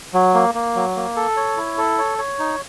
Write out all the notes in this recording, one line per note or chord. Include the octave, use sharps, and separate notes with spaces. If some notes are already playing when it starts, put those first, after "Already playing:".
F#3
A#3
A#3
F#3
A#3
A4
C#5
E4
A4
C#5
C#5
D#4